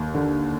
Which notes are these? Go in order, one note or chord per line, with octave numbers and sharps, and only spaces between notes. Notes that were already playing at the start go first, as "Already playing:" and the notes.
Already playing: D#2
D3